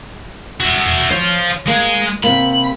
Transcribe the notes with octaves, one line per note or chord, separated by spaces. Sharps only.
F#4 E5
C5 C#5 F5
G#3 A#3
C3 A#3 B5